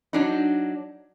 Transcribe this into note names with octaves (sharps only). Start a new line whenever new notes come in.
F#3 D4 D#4